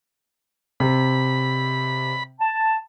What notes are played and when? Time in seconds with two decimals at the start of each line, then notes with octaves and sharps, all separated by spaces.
0.80 C3 B5
2.40 A5